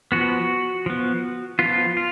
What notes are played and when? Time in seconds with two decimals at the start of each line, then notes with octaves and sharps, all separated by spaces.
0.12 F3 B3 F#4
0.86 F3 B3
1.59 F3 B3 F4
1.97 F4